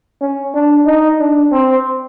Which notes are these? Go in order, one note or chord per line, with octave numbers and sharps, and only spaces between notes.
C#4
D4
D#4
D4
C4